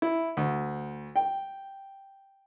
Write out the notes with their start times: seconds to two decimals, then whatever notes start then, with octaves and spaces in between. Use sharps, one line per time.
0.02 E4
0.37 D2
1.16 G5